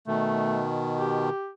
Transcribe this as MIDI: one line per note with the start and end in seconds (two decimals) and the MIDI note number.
0.07 1.30 47
0.07 1.30 51
0.07 0.65 57
0.98 1.50 67